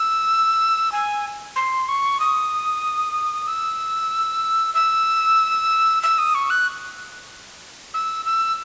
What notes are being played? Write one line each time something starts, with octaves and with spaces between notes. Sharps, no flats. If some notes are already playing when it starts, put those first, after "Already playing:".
Already playing: E6
G#5
C6
C#6
D#6
E6
E6
E6
D#6
C#6
F#6
E6
E6